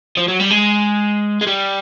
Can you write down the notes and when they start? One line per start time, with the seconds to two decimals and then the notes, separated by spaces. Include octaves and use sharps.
0.17 F3
0.28 F#3
0.40 G3
0.51 G#3
1.41 G#3
1.47 G3